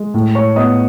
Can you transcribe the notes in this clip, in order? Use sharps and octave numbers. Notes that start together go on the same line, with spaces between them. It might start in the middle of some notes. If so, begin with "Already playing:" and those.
Already playing: G#3
A2
C#5 C#6
B3 D#5 D#6